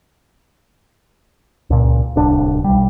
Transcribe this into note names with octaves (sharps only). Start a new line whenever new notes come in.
C#2 A#2
D1 C2 D4
B1 G3